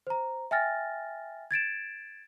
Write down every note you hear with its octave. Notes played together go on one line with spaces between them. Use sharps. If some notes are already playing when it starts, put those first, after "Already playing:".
C5 A#5
E5 G5 G#5 F6 A6 A#6
G#6 A6 D7 E7